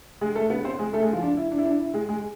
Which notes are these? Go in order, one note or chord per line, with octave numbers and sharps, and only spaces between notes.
G#3 G#4
A3 A4
B3 B4
C4 C5
G#3 G#4
A3 A4
G#3 G#4
F3 F4
D4
E4
D4
E4
D4
E4
G#3 G#4
G#3 G#4